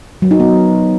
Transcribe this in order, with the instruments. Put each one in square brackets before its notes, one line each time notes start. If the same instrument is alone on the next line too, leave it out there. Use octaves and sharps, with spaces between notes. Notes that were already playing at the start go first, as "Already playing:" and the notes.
[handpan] F#3
D#4
B3